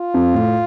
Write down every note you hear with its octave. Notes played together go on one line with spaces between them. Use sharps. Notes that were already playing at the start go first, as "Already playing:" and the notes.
Already playing: F4
F2
A2